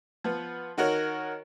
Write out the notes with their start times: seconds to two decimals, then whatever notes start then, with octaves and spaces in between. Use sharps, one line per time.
0.24 F3 B3
0.78 D#3 F#4 A#4 C#5